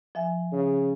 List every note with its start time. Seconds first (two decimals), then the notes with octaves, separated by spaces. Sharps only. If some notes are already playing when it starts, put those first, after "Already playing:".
0.15 F3 E5 G#5
0.52 C#3